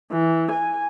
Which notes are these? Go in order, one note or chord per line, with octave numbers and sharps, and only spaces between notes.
E3
G#5